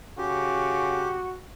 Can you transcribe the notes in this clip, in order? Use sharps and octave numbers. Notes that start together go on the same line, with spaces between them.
C#3 F#4 G4